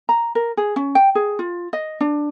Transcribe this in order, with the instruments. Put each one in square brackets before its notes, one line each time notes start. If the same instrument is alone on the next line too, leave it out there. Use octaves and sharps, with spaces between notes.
[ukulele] A#5
A#4
G#4
C#4
G5
G#4
F4
D#5
D4